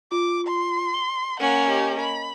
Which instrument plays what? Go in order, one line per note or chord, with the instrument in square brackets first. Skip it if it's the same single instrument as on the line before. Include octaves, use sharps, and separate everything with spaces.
[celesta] F4 [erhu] D6
[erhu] C6
[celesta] G7
[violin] A#3 C#4 [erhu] F#5
[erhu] G4 [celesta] D#5
[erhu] B5